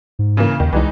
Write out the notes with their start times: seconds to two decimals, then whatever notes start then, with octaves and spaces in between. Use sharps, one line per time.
0.19 G#2
0.37 C#3 E3 A#3
0.60 D#2 D#3
0.73 C2 E3 G#3 D#4